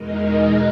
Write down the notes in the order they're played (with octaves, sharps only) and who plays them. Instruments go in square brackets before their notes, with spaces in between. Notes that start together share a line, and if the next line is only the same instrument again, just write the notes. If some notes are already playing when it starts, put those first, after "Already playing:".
Already playing: [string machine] E2 B2 G#3 D#4 A#4